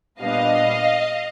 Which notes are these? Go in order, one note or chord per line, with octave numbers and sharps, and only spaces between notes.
A#2 G3 B3 D4 D#5 F5